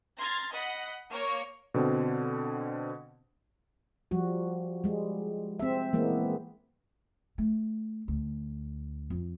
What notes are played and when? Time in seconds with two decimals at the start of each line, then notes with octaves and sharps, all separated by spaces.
0.17 A#5 C6 F6 G#6 A6
0.52 D#5 F#5 B5
1.10 A#3 A#4 C#5 C#6
1.74 B2 D3 C4
4.11 F3 G3 F#4
4.84 G3 G#3
5.59 C4 E5
5.93 E3 G#3 A#3 B3
7.38 A3
8.08 D2
9.10 F2